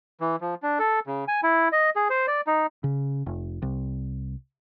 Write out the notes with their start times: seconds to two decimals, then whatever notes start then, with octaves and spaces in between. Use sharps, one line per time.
0.21 E3
0.41 F3
0.63 D4
0.79 A4
1.07 C#3
1.28 G#5
1.43 E4
1.72 D#5
1.96 G#4
2.10 C5
2.27 D5
2.47 D#4
2.84 C#3
3.26 F1
3.62 C2